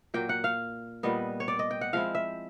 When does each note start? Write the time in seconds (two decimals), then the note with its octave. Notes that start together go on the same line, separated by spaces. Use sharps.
0.14 A#2 F#3 A#3 G5
0.29 F#5
0.44 F5
1.03 A#2 G3 B3 D#5
1.40 C#5
1.48 D5
1.59 D#5
1.71 G5
1.81 F#5
1.93 F3 G#3 C4 E4 F5
2.15 E5